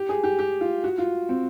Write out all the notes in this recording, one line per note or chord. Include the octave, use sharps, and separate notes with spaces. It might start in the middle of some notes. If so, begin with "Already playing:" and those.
Already playing: G4
G#4
G4
G4
F4
F#4
F4
C4